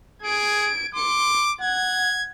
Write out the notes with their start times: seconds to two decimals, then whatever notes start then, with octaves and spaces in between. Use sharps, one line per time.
0.22 G#4 G#6 D7
0.95 C6 D6 C#7
1.61 F#5 G#6